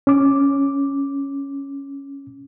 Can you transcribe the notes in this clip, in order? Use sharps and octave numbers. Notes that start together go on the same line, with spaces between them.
C#4 D6